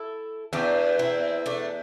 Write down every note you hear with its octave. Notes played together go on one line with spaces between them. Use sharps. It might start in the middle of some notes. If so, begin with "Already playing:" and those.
Already playing: E4 A4
E2 D4 G4
C4 E4
A3 D4